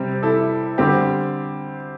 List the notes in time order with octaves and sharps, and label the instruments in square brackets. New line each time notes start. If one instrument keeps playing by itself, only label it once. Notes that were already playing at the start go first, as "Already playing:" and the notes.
Already playing: [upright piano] C3 G3 C4 G4
E4 A4
D3 G3 C4 G4